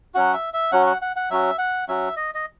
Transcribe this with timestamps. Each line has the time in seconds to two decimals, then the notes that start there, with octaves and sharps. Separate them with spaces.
0.15 F#3 C#4 F#4 F#5
0.33 E5
0.54 E5
0.72 F#3 C#4 F#4 F#5
0.86 F#5
1.02 F#5
1.16 F#5
1.30 F#3 C#4 F#4 E5
1.58 F#5
1.88 F#3 C#4 F#4 E5
2.16 D#5
2.35 D#5